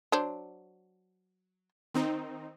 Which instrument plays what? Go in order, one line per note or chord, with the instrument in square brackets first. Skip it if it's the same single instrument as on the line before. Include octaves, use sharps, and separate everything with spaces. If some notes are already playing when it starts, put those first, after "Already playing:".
[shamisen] F#3 D4 C5
[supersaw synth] D#3 C4 D#4